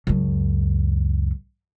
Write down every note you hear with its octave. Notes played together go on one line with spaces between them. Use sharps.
C#2 F#2